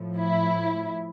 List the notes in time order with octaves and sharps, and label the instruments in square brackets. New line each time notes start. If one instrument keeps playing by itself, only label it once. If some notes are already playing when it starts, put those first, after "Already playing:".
Already playing: [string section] A2 F3
E4